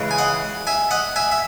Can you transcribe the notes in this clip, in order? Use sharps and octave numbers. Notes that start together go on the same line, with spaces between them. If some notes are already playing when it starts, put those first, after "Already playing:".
Already playing: C#3 E3 G#3
G#5
D#5 F#5
E5 G#5
D#5 F#5
E5 G#5
E5